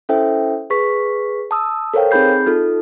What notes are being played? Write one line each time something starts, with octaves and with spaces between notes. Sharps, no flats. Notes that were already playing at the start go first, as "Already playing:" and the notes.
C#4 E4 A4 C5 E5 G5
G#4 B4 C#6 B6
A5 D#6 E6
A4 A#4 C5 C#5 F5 G5
C4 D#4 G#4 B5 G6 C7
D#4 F4 A4